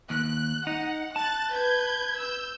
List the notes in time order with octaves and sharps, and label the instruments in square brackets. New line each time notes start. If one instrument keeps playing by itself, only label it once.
[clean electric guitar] D#2 [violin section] F#6
[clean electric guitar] D#4 [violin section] F#5
[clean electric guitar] A5 [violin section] F#6 A6
[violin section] B4 G6 G#6
E6 G6